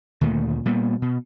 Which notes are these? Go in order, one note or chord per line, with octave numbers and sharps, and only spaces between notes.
D2 A#2 D#3 A3
A#2 G3 A#3 B3
B2